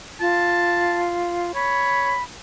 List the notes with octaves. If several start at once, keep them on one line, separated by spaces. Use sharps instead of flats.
F4 A5
C#5 B5